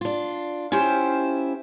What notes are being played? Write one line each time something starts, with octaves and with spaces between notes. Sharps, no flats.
D4 F4
C#4 E4 F4 G4 C5